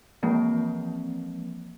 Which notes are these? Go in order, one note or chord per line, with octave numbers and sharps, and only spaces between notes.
E3 F3 G#3 A#3 C4